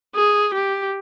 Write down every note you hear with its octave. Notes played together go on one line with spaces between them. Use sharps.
G#4
G4